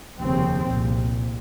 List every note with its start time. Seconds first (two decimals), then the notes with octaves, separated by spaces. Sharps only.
0.19 F1 D#2 C#3 C4
0.69 C2 A#2